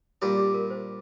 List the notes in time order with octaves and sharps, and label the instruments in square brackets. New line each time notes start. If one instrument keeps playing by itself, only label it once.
[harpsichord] A#2 G3 D4 [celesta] G4
[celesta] G4
A#4
C5